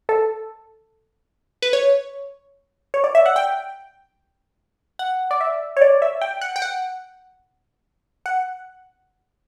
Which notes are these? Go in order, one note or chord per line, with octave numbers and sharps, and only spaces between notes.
A4
B4
C#5
C#5
D5
E5
F#5
G5
F#5
D5
E5
C#5
D5
E5
G5
F#5
G5
F#5
F#5